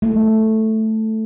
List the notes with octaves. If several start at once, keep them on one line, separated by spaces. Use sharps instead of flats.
A3